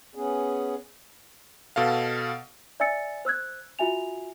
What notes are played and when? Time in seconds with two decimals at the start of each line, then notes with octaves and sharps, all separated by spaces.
0.15 B3 C#4 G#4
1.76 B2 A4 F5
2.80 D5 E5 G#5 E6 A6 C#7
3.25 C5 E6 F#6 G#6
3.79 F4 F#4 E5 G#5 F7